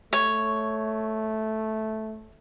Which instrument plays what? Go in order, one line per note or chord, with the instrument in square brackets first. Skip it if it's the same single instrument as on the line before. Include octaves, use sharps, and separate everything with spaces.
[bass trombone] A3 [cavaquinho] C#5